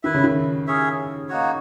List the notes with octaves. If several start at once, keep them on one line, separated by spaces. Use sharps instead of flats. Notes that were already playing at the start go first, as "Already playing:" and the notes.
D#3 E4 B4 E5
C#3
D#3
C#4 G#4 C#5 E5
A#3 D#4 F#4 C#5